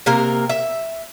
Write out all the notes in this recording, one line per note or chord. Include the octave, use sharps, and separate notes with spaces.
C3 A#3 A#4
E5